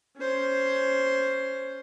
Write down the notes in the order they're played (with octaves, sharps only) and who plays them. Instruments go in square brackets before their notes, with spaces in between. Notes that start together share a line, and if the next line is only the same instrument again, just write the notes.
[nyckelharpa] C#4 C5